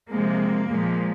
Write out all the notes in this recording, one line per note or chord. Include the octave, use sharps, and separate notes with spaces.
C3 F3 G#3 A#3
A#2 F3 G#3